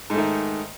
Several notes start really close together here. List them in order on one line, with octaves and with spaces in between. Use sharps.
G#2 A3 D#3